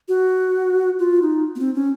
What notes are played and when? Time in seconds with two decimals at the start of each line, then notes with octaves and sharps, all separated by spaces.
0.08 F#4
0.99 F4
1.22 D#4
1.55 B3
1.59 C4
1.75 C#4